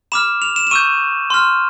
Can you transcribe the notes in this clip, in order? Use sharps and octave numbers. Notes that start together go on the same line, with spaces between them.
B5 D6 F6 E7
F7
E7
E7
C#6 E6 G6 D#7
C6 F6